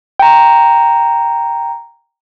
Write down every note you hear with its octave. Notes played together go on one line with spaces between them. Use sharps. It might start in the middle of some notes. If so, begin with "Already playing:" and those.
G5 A#5